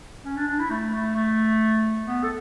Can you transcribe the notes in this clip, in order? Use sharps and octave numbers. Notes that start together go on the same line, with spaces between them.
C#4
D4
D4
E4
A3
A3
A3
B3
A4